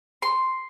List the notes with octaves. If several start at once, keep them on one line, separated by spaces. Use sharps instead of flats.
C6